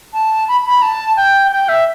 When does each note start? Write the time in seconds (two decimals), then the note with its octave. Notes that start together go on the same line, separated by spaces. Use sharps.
0.13 A5
0.48 B5
0.67 B5
0.82 A5
1.17 G5
1.52 G5
1.69 E5